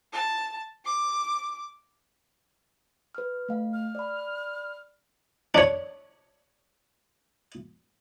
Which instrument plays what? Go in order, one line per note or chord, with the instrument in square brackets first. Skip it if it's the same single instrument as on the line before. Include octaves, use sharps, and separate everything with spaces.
[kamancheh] A5
D6
[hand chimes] B4 F6
A3 F5
[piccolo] F6
[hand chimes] D5 B5
[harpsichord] D4 C#5